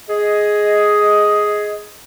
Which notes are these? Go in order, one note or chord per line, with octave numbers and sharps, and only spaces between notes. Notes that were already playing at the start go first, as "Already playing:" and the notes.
G#4 D#5